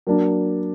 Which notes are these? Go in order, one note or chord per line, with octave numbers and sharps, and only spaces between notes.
F#3 A#3 D4